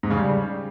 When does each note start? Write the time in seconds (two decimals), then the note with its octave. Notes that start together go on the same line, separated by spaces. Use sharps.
0.03 G#2
0.10 C#3
0.18 G3